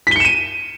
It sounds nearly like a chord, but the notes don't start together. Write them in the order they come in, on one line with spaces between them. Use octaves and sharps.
B6 G7 C#7 E7 D#7